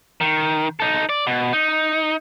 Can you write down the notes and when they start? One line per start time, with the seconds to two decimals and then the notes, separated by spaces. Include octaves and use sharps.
0.21 D#3
0.80 D#4 A4
1.09 D5
1.27 B2
1.53 D#4